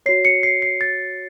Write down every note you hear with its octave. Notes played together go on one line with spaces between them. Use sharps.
F#4 C#5 C7
C#7
C7
C7
A6